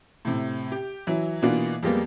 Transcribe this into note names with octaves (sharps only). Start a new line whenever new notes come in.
A2 C3
G4
E3 F#3 E4
B2 E3 A#3 D4 F4 F#4
F2 G3 G#3 A#3 B3